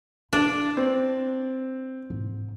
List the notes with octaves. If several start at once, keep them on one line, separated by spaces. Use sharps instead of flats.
D4 E4
C4
G#2